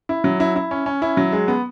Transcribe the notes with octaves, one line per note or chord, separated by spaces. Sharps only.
E4
F#3
E4
E4
C#4
C#4
E4
F#3
G#3
B3